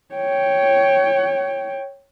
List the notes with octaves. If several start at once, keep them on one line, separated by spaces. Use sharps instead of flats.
C#5 G5